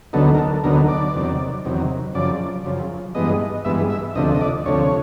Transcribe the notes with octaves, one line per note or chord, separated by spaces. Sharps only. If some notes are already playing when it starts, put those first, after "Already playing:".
D2 D3 F#3 B3 D#4 A4
A#4
A4
D2 D3 F#3 B3 D#4 A#4
D5
E2 C3 D#3 F#3
E2 C3 D#3 F#3
F#2 C#3 F3 D5
F#2 C#3 F3
G2 E3 G#3 B3 D#5
G2 E3 G#3 B3 E5
E5
D2 C3 F3 A3 D4 D#5
D#5
D5
D2 C3 F3 A3 D4 C#5